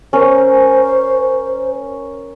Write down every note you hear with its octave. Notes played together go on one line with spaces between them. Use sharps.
C#4 A#4 C5